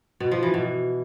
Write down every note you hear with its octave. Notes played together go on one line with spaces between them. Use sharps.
B2
F3
E3
B2